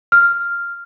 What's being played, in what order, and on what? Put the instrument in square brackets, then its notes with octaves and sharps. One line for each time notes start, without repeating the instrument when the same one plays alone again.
[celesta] F6